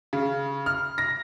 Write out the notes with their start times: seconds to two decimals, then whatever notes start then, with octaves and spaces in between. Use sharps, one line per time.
0.13 C#3
0.66 F6
0.98 A#6